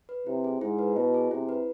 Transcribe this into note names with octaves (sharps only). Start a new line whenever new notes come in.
B4
C3 E4
G#4
G#2 E4
B4
B2 E4
G#4
C3 E4
B4